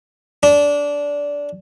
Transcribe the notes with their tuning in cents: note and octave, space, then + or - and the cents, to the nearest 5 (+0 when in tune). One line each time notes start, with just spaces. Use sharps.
D4 -20